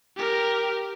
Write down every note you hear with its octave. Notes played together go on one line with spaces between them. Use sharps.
G4 A#4